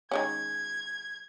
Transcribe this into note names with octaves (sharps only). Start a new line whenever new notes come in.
D#3 G#3 C#4 G#6